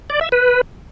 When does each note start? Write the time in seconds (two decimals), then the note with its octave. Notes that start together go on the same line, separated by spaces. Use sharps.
0.10 D5
0.21 E5
0.32 B4